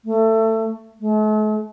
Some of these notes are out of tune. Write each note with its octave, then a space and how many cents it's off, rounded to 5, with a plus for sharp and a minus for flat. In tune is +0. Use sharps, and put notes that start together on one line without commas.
A3 +20
A3 -45